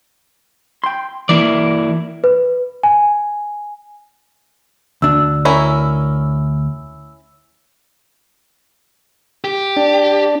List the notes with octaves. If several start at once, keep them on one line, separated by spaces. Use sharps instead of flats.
G5 C6
E3 A#3 E4 D5
B4
G#5
D2 D4 E6
C#4 E4 A#4
G4
D4